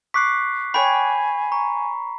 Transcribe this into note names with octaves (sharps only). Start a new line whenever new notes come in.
C#6 D6 F#6 B6 C7
C#5 G5 G#5 B5
A#5 C#6